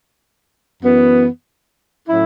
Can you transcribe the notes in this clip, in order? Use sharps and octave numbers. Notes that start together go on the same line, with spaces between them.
F#2 E3 B3
A2 F#3 C#4 E4